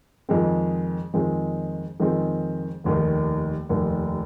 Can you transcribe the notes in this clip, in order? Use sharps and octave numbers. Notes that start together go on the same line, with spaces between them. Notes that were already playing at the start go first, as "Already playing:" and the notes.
F2 D#3 G#3 C4
F2 D#3 G#3 C4
F2 D#3 G#3 C4
F1 D#2 D#3
F1 D#2 D#3